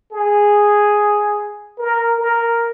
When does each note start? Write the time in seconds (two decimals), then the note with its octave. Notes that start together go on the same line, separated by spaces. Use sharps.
0.12 G#4
1.79 A#4
2.21 A#4